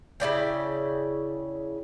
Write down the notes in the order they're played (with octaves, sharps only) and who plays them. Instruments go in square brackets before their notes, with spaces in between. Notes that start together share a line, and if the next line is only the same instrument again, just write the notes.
[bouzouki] C#3 E4 D5 G5